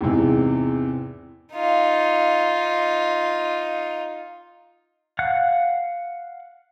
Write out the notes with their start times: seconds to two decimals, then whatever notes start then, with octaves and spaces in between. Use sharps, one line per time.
0.01 E2 G#2 C3 E3
1.54 D#4 F4
5.19 F5 F#5 F#6